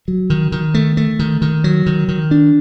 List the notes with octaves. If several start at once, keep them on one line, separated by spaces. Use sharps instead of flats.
F#3
D#3
D#3
A3
A3
D#3
D#3
F#3
D#3
D#3
D4